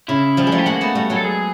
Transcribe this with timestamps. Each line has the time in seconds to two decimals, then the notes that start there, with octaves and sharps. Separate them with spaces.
0.08 C#3 E4
0.37 F3 G3
0.47 G#3
0.52 G3 A3
0.59 G4
0.66 G#3 A#3 F#4
0.81 A3 B3
0.95 G3 A3
1.10 F#3 G#3
1.16 A4
1.24 G#4